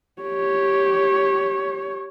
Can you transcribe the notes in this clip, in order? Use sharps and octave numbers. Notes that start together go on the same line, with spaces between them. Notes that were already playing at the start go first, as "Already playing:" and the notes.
G4 C#5